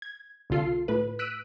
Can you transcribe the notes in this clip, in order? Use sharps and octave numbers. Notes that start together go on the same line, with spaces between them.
G#6
C2 D3 F4 A4 C7
A2 B4
E6 F#6 B6 D7 D#7